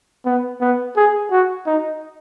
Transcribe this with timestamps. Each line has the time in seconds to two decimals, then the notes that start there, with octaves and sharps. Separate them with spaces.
0.26 B3
0.61 B3
0.97 G#4
1.31 F#4
1.67 D#4